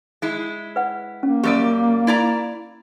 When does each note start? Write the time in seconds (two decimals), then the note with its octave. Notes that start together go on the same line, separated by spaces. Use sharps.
0.22 G#3 E4
0.76 B4 F#5
1.23 A#3 C#4
1.43 F#2 G3 G4 A#4 D5
2.07 E4 D5 A#5